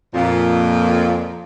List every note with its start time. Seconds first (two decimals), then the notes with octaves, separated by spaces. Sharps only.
0.14 F2 A#2